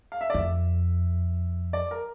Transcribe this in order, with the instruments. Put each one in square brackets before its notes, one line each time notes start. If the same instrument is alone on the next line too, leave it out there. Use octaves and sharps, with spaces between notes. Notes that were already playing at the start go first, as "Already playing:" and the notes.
[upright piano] F5
E5
D5
[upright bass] F2 [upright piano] E5
[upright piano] D5
A#4